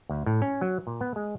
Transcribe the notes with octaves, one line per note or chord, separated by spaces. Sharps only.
D2
A2
C#4
F#3
A#2
B3
G#3